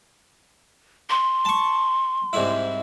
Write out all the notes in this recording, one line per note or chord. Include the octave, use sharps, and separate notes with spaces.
C6
A5 C#6
C2 G#2 E4